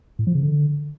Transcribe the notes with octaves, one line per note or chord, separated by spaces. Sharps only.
A2
F3
C#3
D3